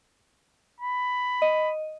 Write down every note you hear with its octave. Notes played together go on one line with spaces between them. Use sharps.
B5
D#5